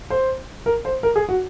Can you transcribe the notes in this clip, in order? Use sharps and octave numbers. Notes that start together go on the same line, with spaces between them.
C5
A#4
C5
A#4
G#4
F#4